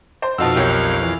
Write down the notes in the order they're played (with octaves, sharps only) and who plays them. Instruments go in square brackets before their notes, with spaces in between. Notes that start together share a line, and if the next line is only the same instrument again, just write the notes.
[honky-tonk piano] C5
[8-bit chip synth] F2 F5 [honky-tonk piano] B2 D#4 F#4 [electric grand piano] A5 E6
[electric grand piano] B1 A#4 [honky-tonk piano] G4 C#5
[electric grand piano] E3